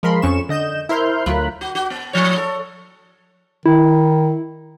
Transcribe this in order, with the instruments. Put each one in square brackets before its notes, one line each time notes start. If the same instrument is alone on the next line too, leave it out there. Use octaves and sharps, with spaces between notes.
[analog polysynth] F3 G#3 A#4 B5 C6
F2 C#4 C#6 E7
D3 D#5 G6 E7
E4 A#4 C5 C6 F6 G6
D2 F#3 F4 A#4 B5 F#6
[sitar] F#4
F#4
B3
A2 F3 C#5
A4
[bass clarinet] D#3 [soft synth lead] E4